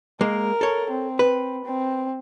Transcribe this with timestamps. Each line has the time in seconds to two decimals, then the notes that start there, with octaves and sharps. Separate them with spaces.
0.21 G#3 A#3 A#4
0.61 A4 C#5
0.91 C4
1.19 B4
1.65 C4